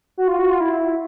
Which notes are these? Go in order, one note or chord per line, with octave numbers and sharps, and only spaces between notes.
F#4
F4
F#4
F4
E4